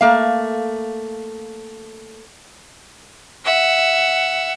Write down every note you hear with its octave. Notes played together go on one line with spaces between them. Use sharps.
A3 A#3 F5
E5 F#5